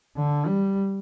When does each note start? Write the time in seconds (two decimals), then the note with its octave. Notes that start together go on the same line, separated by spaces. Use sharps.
0.17 D3
0.47 G3